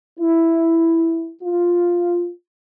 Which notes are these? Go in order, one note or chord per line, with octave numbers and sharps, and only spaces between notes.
E4
F4